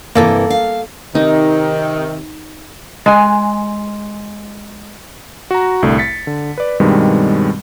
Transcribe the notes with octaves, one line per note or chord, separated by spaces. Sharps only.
G2 C3 E3 A#3 A4
F5
C3 D#3 D#4
G#3 G#5
F#4 A#5
C2 A2 D3 A3
A6 B6 C#7
D3
B4 D5
G2 B2 D#3 G3 G#3 C4